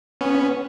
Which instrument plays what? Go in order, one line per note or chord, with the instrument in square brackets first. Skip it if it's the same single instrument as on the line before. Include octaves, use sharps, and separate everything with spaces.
[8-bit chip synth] B3 C#4